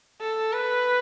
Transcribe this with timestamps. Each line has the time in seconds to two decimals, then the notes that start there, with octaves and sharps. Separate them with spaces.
0.21 A4
0.53 B4